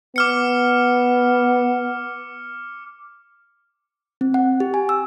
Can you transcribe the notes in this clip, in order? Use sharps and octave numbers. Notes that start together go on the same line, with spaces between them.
B3 D6 F6 C#7
C4
F#5
G4
G#5
E6